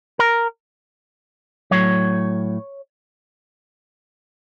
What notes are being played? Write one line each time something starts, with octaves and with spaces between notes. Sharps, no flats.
A#4
A2 F#3 C#5